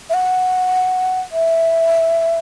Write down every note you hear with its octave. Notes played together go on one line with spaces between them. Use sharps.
E5
F#5
E5